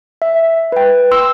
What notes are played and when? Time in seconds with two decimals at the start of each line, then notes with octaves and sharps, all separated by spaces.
0.22 E5
0.72 B4 G5
1.11 C6 E6